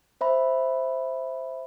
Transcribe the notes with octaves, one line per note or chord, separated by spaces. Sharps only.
C5 E5 B5